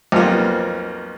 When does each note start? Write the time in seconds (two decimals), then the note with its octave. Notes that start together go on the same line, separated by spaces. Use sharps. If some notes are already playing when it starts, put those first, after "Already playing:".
0.12 B1 F2 F3 A#3